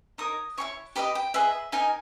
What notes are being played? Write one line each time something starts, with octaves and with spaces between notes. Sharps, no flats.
D#4 A#4 C#5 D#6
E4 G#4 C#5 C#6
G4 B4 D#5 B5
G5
G#4 B4 D#5 E5
D#4 A#4 D#5 G#5